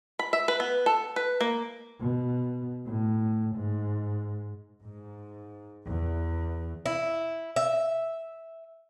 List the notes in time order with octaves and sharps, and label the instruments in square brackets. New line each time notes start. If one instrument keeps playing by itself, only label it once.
[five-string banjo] B5
E5
B4
B3
A4
B4
A#3
[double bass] B2
A2
G#2
[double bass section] G#2
E2
[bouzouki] E4
E5